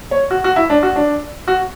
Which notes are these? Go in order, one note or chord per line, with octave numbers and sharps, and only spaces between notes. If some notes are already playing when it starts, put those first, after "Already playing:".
C#5
F#4
F#4
E4
D4
F#4
D4
F#4